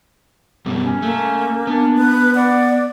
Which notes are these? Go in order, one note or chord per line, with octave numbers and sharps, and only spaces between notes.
F#2 B2 G3
C#4
A3 A#3
B3 D4
B4
D5 F#5